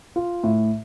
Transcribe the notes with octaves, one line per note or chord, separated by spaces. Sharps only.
F4
A2